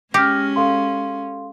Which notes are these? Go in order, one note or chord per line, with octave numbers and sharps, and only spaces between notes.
G#3 C#4 G4 F6 A#6
A4 F5 C6